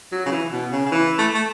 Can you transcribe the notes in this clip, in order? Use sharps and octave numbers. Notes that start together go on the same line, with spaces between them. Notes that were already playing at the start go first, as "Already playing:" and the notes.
F#3
C#3
E3
B2
C#3
C#3
E3
A3
A3